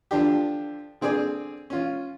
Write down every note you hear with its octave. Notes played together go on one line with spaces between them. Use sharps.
D3 F3 D4 G4
D3 C4 G#4 D5 G#5
C#4 F4